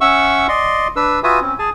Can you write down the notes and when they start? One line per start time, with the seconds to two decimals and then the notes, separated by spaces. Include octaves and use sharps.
0.01 C#4 E5 F#5 C#6 E6
0.48 D5 D#5 C6
0.96 D4 B4 E6
1.24 F4 F#4 B4 E5 G#5 D#6
1.41 C4 C#4
1.59 G#4 G#5 A5